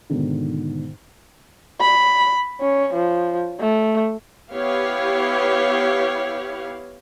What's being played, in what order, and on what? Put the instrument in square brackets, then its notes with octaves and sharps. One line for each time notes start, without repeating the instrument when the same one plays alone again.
[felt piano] G#2 B2 D3 D#3
[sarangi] B5
C#4
F3
A3
[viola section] B3 E4 G4 C#5 F5